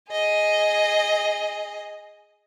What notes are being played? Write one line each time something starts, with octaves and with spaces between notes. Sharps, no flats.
G#4 D#5